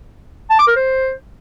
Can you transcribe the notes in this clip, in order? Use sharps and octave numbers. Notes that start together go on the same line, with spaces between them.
A5
D6
A#4
C5